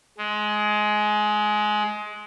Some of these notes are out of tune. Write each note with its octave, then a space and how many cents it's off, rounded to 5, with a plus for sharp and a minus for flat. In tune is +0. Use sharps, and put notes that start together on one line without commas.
G#3 +20